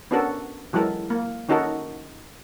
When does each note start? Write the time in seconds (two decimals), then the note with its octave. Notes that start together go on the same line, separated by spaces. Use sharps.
0.11 B3 C#4 D4 F#4 A4 A#4
0.73 E3 F#3 G#3 A4 A#4
1.10 A#3
1.49 D#3 C#4 D#4 F#4 A4 A#4